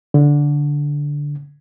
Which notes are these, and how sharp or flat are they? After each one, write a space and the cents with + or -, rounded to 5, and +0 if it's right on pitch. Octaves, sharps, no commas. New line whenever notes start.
D3 -10